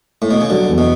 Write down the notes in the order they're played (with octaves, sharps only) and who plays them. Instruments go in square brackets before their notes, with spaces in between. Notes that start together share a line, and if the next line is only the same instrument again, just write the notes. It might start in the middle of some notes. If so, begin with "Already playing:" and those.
[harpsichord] A2
B2
C#3
[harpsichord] D3 [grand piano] F#3
[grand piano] E2
[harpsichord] B2